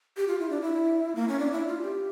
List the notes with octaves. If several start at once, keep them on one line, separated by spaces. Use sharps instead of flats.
G4
F4
E4
D4
E4
A#3
C#4
D4
E4
F4
G4